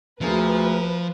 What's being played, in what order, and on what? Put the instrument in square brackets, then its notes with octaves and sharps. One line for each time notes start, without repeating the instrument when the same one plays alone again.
[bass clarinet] D2 [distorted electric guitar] F3 [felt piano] A3 A#3 G#4 [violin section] B4